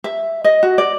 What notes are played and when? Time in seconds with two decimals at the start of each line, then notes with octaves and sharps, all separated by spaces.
0.04 E5
0.44 D#5
0.63 F#4
0.78 D5